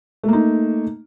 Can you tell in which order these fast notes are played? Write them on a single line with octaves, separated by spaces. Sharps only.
A3 A#3 D#4